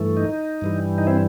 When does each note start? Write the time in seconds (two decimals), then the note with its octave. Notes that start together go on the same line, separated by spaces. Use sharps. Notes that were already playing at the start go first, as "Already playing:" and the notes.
Already playing: G2 E3 A3
0.17 D#4
0.61 G2 E3 G3
0.98 D#4
1.07 C4 E4